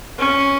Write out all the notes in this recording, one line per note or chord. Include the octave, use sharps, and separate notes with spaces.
C#4